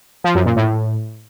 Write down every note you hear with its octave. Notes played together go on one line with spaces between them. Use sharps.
F3
F#2
A#2
A2